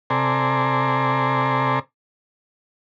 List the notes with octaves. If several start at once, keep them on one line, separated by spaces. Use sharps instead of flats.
C3 A4 C5 D5 G#5 A#5